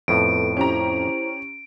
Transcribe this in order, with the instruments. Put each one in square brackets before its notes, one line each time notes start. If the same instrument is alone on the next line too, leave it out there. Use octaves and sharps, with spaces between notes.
[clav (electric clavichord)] F2 A2 [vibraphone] B3 A4 B4 [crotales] D7
[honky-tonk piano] C#4 G4 A#5 [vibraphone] E4 C5